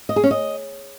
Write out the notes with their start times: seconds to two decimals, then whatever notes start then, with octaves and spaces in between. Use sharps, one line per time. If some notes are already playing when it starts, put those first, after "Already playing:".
0.09 D#5
0.16 G#4
0.24 C#4
0.31 D#5